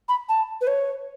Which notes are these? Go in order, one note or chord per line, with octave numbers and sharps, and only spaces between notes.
B5
A5
B4
C#5